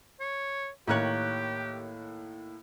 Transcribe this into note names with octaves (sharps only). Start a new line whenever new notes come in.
C#5
A2 D#3 A#3 G4 A#4 C#5 F#6